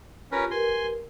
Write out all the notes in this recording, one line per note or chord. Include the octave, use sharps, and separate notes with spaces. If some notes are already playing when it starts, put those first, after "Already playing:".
C#4 F4 G4 A#4 B4
G4 A#4 B4 G#5 C6